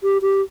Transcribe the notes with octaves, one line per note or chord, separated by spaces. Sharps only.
G4
G4